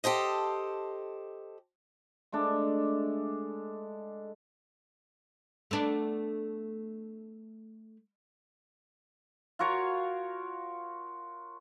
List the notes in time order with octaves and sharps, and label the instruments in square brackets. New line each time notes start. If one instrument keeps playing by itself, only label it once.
[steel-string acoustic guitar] G4 A4 C5 D#5
[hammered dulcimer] G#3 A3 D4
[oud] A3 B3 D4
[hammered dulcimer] F4 F#4 A#4 C#5